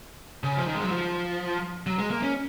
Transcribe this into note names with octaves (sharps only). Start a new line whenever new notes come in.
C#3
F3
D#3
G#3
F#3
F3
F#3
G#3
A#3
C#4